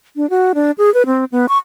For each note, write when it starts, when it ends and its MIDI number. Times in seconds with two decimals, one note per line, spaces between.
0.16 0.29 62
0.30 0.53 66
0.55 0.71 62
0.78 0.92 68
0.94 1.03 71
1.06 1.25 60
1.32 1.46 59
1.49 1.58 85